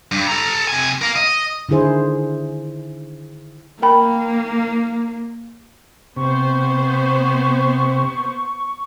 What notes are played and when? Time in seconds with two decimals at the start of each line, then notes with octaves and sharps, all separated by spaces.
0.12 G2
0.27 A4 A#5
0.67 C3 G#5
1.02 A#4 F5
1.16 D#5
1.69 D3 D#3 E4 G#4 C5
3.82 A#3 A#4 G5 B5
6.16 C3 B3 C5 C#6